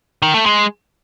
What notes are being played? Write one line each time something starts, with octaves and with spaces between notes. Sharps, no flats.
D#3
A3
G#3